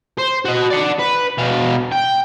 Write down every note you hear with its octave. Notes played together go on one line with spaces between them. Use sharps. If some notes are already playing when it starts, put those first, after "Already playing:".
C5
F#4 D#5
D5 F#5
B4
B2 F5
G5